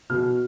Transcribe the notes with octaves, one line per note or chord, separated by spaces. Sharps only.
B2 F6